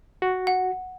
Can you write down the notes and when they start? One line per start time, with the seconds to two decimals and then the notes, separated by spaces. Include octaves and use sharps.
0.22 F#4
0.47 F#5